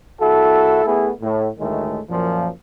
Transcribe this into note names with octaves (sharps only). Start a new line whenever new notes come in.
C2 E4 F#4 A4
A3 B3 E4 G#4
A2
D2 A2 D#3 G#3 A3
F#2 A#2 F3